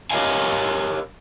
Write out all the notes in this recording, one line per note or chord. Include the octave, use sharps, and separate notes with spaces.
G4 A#4 C#5 D#5 F5 G#5